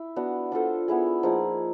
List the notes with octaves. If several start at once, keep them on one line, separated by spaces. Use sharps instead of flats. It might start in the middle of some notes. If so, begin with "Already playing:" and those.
Already playing: E4
B3 D4 F#4
D4 F4 A4 C5
B3 E4 G#4
F3 A#3 D#4 G#4